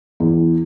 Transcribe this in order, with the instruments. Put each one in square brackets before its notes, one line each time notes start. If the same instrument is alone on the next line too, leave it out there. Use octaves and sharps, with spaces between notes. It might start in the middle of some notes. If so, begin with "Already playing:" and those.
[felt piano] E2